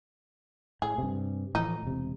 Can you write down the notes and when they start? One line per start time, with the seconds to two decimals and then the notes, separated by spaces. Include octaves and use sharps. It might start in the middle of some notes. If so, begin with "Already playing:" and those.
0.82 A2 G#4
0.98 G2 C3
1.55 A2 E3 F3 D#4
1.83 E1 C3